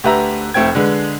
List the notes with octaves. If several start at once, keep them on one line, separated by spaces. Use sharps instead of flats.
D2 G4 B4 E5 A#5
F1 A3 C4 G5 G#6
D3 G#3 B4